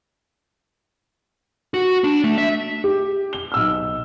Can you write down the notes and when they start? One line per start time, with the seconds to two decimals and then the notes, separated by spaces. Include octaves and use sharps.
1.74 F#4
2.04 D4
2.24 A3
2.38 E5
2.84 G4
3.33 G7
3.52 B1 E6 F6